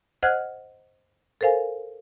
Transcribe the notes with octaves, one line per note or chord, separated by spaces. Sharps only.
C5 D#5 F#5 F6 F#6 G#6
A4 A#4 C5 F5 G#5